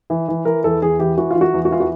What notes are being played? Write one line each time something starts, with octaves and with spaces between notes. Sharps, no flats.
E3
E3
E3 A#4
E2 A4
E2 G#4
E3 G4
E3 F#4
E3 F4
F#4
E2
F#4
E3 F4
F#4